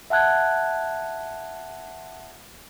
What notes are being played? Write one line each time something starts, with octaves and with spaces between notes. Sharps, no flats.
E5 F#5 A5 F#6 G#6